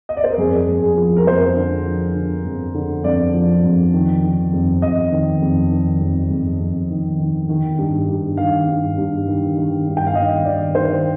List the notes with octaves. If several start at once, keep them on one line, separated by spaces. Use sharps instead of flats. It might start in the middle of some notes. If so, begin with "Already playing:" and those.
D#5
D5
C5
A#4
F2 G#4
F2
G#4
F3
A#4
F2 C5
D3
F3
D3
F2
D3
F2 D5
F3
F2
D#3
D#3
F2
F2 D#5
D#3
F2
D#3
F2
F2
F2
D#3
D#3
D#3
G2
G2
D#3 F5
G2
G2
D#3
D#3
G2
G5
F5
D#3 D#5
D#3 D5
D#3 C5